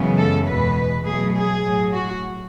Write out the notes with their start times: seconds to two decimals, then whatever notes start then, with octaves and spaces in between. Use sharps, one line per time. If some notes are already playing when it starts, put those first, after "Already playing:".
Already playing: F#2 C#3 E3 G#3 B3
0.17 A4
0.47 E2 B2 G#3 B4
1.04 B2 F#3 A3 G#4
1.34 G#4
1.63 A2 F#3 A3
1.93 F#4